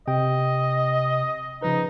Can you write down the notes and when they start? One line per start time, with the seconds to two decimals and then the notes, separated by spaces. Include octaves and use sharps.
0.08 C3 D#5 G5
1.62 C#3 F3 D#4 B4